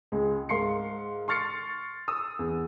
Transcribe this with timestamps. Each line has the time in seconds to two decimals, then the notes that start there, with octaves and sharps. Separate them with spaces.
0.12 C#2 G#3
0.49 G#2 A#4 F5 C6 C7 C#7
1.28 C6 C#6 F6 A6 C7 C#7
2.08 D#6 E6
2.39 E2